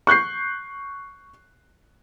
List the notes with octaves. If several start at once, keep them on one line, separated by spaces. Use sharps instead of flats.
C#6 F#6 G6 C7